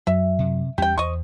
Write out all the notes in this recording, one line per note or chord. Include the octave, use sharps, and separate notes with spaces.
F#2 F#3 E5
C3
E2 G3 C#4 G4 G5
E2 C5 D#5 C#6